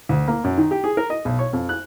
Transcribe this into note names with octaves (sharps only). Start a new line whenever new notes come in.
D2
A#3
F#2
D#3
G4
G#4
A#4
D#5
B1
C#5
F2
F#6